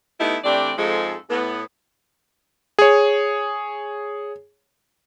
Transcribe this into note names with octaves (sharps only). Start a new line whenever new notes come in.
A3 B3 D#4 E4 G4 B4
E3 A3 C4 D4 G4 D5
F2 G#2 F3 G#3 G#4 A4
A2 B3
G#4 C#5